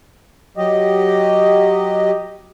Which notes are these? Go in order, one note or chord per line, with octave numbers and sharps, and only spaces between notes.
F#3 G4 D#5